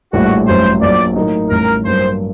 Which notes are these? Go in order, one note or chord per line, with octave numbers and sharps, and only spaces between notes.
A#1 A2 G3 F#4
A1 G2 F#3 C5
A#1 A#2 F#3 D5
A2 F#3 A#3 D#4
A1 A2 G3 A#4
G2 F#3 A#3 C5